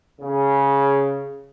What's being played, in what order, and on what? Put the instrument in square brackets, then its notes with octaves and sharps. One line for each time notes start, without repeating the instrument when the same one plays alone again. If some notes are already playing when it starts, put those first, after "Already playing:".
[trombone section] C#3